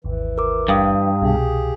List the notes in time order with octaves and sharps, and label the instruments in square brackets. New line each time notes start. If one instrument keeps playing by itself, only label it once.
[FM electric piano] G#1 D#2 [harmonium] E3
[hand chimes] A#4 D6
[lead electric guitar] G2 [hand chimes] F5 G5 D#6
[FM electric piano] C2 B2 [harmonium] G4 G#4